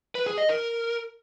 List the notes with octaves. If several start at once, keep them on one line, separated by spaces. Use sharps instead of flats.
B4
G#4
D#5
A#4